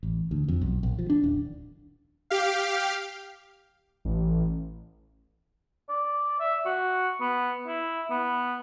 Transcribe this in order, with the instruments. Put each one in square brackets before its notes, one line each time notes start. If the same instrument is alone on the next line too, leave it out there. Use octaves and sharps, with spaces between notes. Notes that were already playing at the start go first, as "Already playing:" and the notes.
[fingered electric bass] A1
D2
F2
B1
A#1
F3
D4
D#1
[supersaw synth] G4 F5
[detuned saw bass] A1
[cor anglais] D5
E5
F#4
B3
E4
B3